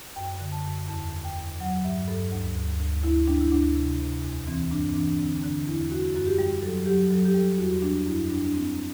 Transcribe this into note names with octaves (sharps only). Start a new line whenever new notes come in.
F#2 G5
D3
A5
F#2
E2 A5
E2
G5
E2
F#3 F#5
G2 E5
G2 A4
D2
D2
D2
D2 E4
G3 D4
E4
D2 D4
C3
C3
E2
E3 C4
G2 D4
C4
E3 D4
D4
D3 C4
D3 D4
E2 E4
G3 F#4
F#2 F#4
G4
G3
F#3 A4
F#3 G4
F#3 A4
G4
G3 A4
E2 F#4
G3 D4
F#2 E4
G3 D4
D4
G3 C4